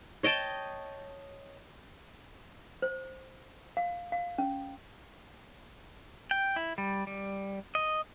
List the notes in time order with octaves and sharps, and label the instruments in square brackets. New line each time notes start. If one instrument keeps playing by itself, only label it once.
[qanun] C#5 D#5 G5 A5
[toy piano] C5
F5
F5
C#4
[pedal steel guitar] G5
E4
G3
G3
D#5